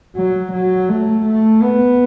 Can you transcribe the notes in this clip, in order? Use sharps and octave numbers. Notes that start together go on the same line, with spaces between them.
F#3
F#3
A3
A3
B3